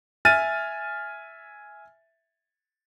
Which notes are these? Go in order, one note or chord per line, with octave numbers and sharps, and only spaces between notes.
E5 G#5 F6 A6 D#7